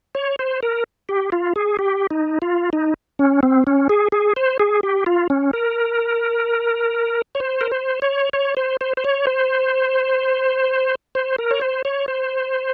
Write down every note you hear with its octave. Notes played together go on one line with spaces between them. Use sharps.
C#5
C5
A#4
G4
F4
G#4
G4
D#4
F4
D#4
C#4
C4
C#4
G#4
G#4
C5
G#4
G4
F4
C#4
A#4
C#5
C5
A#4
C5
C#5
C#5
C5
C5
C5
C#5
C5
C5
A#4
C#5
C5
C#5
C5